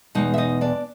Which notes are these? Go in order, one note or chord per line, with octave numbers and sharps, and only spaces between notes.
E2 B2 G#3 D#4 D#5
E5
D#4 D#5
D4 D5